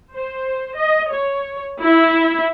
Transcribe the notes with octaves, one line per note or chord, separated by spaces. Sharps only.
C5
D#5
C#5
E4